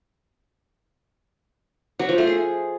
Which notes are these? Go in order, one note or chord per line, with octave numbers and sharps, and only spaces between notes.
F#3
F3
A3
G#4